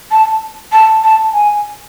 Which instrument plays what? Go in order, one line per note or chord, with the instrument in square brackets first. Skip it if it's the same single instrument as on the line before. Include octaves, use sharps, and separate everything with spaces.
[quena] A5
A5
A5
G#5